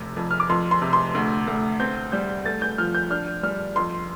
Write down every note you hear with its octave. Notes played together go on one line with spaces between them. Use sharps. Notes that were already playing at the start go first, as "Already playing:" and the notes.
Already playing: F1 C3
F2
F6
D6
F2 C6
C6
C3
C6
D2
D2
C4 G6
G3 G6
A3 A6
G6
F3 F6
G6
D4 F6
G3 F6
F2 C6